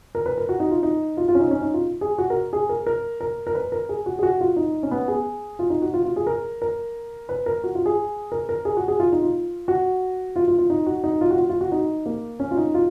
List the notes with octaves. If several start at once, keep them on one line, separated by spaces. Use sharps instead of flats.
A#4
B4
A#4
F#4
D#4
F4
D#4
F4
F4
C#4
D#4
C#4
D#4
F4
G#4
F#4
A#4
G#4
A#4
A#4
A#4
A#4
B4
A#4
G#4
F#4
G#4
F#4
F4
D#4
C#4
B3
G#4
F4
D#4
F#4
F4
F4
G#4
A#4
A#4
B4
A#4
F#4
F4
G#4
A#4
A#4
G#4
F#4
G#4
F4
D#4
F4
F#4
F4
F4
F4
D#4
F#4
D#4
F4
F#4
F4
F4
F#4
D#4
A#3
C#4
F4
D#4
F4